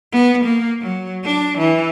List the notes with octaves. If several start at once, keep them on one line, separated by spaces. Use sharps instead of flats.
B3
A#3
F#3
D4
E3